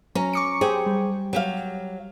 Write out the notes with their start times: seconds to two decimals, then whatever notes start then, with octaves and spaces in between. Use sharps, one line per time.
0.15 F#3 C#4 A#5
0.33 C#6 D6 C#7
0.61 G4 G#4 C5 G5
0.86 G3
1.33 F#3 G4 F5